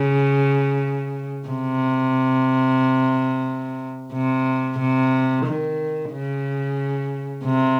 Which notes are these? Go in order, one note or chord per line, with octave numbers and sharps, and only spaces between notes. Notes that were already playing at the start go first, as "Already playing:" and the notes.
Already playing: C#3
C3
C3
C3
D#3
C#3
C3